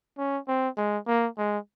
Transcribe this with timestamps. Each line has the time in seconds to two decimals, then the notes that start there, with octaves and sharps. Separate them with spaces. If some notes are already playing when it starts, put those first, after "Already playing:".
0.18 C#4
0.48 C4
0.77 G#3
1.07 A#3
1.38 G#3